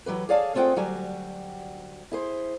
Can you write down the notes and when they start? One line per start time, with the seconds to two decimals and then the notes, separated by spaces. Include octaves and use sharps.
0.06 E3 F#3 G4 B4
0.29 G#4 C#5 D5 F5 G#5 A5
0.54 A3 C4 F4 G#4 F#5 G5
0.76 D2 F#3 G3 F#4 G4 G#5
2.12 E4 G#4 C5